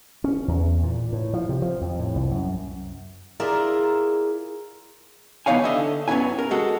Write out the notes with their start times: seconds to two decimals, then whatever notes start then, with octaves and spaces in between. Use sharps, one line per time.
0.24 C#4
0.48 E2
0.83 A#2
1.13 A2
1.33 F3
1.49 C3
1.62 F3
1.81 F2
1.99 A2
2.16 C2
2.31 F#2
3.40 E4 F4 G#4 A#4 D5 E5
5.46 E3 B3 D#4 C#5 F5 G#5
5.64 D3 D#5 E5
6.08 F#2 F#3 B3 C#4 E4 G#5
6.39 A#4
6.51 G#3 F#4 A4